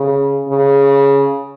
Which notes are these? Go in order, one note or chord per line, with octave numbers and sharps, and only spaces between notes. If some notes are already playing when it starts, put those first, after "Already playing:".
Already playing: C#3
C#3